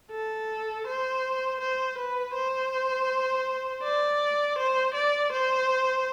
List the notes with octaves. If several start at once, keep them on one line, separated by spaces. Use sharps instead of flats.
A4
C5
C5
B4
C5
D5
C5
D5
C5